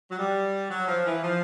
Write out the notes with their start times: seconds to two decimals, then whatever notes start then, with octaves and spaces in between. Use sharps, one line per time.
0.10 F#3
0.18 G3
0.70 F#3
0.88 F3
1.06 E3
1.23 F3